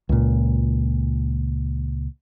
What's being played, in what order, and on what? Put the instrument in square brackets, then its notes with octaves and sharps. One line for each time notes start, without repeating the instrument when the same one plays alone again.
[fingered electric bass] C#2 A#2